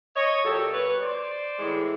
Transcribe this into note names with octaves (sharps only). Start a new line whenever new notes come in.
C#5 D#5
A#2 F#3 G4 A4
B4 C#5
C5 D5
A2 E3 G#3